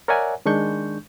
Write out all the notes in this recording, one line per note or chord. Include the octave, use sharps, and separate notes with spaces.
A#4 C#5 D5 E5 F#5 G#5
D#3 G#3 D4 C#6 G6